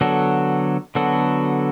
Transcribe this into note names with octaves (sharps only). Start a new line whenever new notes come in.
D3 F#3 B3 F#4 A4
D3 F#3 B3 F#4 A4